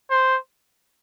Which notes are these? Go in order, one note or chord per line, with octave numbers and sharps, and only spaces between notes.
C5